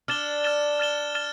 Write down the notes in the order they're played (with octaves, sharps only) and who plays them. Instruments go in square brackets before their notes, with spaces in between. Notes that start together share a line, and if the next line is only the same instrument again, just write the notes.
[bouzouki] D4 [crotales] F6 A6 E7 G7
[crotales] F6 A6 E7 G7
F6 A6 E7 G7
F6 A6 E7 G7